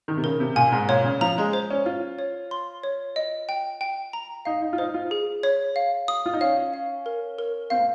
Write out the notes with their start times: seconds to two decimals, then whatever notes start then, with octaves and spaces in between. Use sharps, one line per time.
0.08 D#3
0.17 C3
0.24 C#3 A#4
0.40 C3
0.56 A#2 G#5
0.72 G#2
0.89 A#2 C#5
1.05 C#3
1.21 F3 A#5
1.38 G#3
1.53 C5
1.70 C#4
1.86 F4 C#5
2.19 C#5
2.51 C6
2.83 C#5
3.16 D#5
3.49 G5
3.81 G5
4.13 A#5
4.45 D#4 F5
4.62 D#4
4.73 F4
4.78 D#4 C5
4.94 F4
5.11 G#4
5.43 C#5
5.76 F5
6.08 D#6
6.26 F4
6.34 D#4
6.41 C#4 F5
6.74 F5
7.06 A#4
7.39 A#4
7.70 C4 F5
7.79 A#3